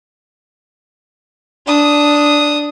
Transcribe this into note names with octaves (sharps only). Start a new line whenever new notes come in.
D4 D#6